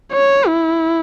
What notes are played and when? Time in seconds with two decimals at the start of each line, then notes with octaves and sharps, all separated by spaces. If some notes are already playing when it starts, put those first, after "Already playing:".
0.13 C#5
0.47 E4